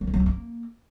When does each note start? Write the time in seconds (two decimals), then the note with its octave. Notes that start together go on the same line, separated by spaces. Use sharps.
0.01 F#3
0.07 F3
0.14 F#3
0.20 C4
0.26 A#3